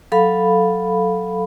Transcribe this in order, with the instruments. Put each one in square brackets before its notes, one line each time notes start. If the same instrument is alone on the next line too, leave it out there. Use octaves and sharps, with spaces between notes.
[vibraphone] F#3 A4 F5 B5